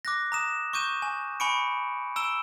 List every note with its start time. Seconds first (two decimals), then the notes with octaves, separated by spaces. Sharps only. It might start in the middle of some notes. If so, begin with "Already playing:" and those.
0.05 D6 F#6 A#6
0.32 A#5 D#6 E7
0.73 C#6 D6 G6 D#7 E7
1.02 G#5
1.40 G#5 B5 C#6 C#7 D7
2.16 A#5 E6 D7 E7 G7